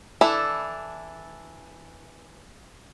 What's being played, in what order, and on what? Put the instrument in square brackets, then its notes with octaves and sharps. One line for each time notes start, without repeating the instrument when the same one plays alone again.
[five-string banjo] E3 D4 E4 A4